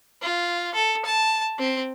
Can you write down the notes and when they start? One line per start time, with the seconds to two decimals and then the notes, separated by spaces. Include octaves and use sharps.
0.22 F4
0.74 A4
1.05 A5
1.59 C4